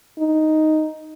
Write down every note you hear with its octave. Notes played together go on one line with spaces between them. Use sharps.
D#4